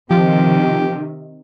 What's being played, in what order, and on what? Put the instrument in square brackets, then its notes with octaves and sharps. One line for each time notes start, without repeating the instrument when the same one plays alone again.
[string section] C3 D#3 [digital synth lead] F3 [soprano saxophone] G4